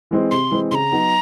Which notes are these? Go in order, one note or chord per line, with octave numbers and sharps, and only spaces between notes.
E3 G#3 C4
C3 C6
E3 G#3 C4
C#3 A#5 C6
F#3 B3 D#4